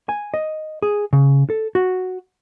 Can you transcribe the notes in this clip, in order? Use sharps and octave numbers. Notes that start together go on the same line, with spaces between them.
G#5
D#5
G#4
C#3
A4
F#4